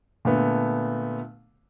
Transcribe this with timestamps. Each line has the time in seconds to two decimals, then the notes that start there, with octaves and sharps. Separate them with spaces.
0.25 A#2 D3 A3 B3